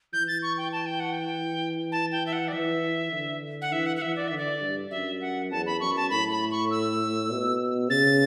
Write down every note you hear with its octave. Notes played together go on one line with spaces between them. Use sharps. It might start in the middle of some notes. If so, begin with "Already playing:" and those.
E3 G6
A6
C#6
G5
A5
G5
F#5
G5
A5
G5
E5
F#5
D5
E3 E5
D3
F#5
E3 E5
F#5
F#5
E3 E5
D5
D3 E5
D5
G2
F#2 E5
F#5
E2 A5
B5
F#2 C#6
A5
A2 B5
B5
C#6
E6
B2
C#3 A6